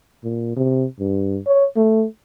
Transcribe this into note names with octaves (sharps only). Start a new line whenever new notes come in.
A#2
C3
G2
C#5
A3